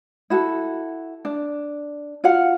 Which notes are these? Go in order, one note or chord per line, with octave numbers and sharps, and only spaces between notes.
E4 F#4 A4
D4
F4 F#4 F5 F#5